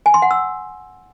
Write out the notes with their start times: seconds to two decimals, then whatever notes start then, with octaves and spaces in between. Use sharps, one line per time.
0.06 G#5
0.14 C6
0.22 F#5
0.31 E6